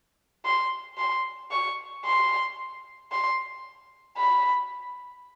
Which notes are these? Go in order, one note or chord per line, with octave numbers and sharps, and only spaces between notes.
C6
C6
C#6
C6
C6
B5